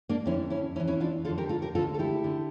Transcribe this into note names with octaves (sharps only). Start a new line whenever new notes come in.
A#3 D4
F2 D3 C#4 E4
C#4 E4
E2 E3 C#4 E4
C#4 E4
D4 F4
F2 D3 F4 A4
G4 A#4
F4 A4
G4 A#4
D2 D3 F4 A4
A4
E4 G4
D3